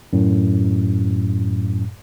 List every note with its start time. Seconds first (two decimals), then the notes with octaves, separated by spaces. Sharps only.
0.13 F#2 A2